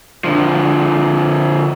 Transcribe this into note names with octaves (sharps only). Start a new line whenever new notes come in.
D3 F3